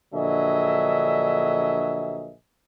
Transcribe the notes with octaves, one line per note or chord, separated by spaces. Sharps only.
A#1 D3 F#3 D#5 E5 G#5